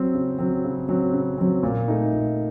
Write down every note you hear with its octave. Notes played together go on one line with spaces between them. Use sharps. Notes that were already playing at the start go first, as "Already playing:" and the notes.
Already playing: F#3 C4
C#3
F#3 C4
C#3
F#3 C4
C#3
F#3 C4
A#2
A3 D#4
A#2